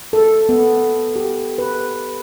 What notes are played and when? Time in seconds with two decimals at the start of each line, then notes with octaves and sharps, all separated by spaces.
0.13 A4
0.49 B3
1.16 G4
1.58 B4